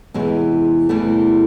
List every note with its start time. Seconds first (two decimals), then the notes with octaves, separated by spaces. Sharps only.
0.14 E2 C3 E3 F#3 G#3
0.89 E2 C3 E3 G3 A3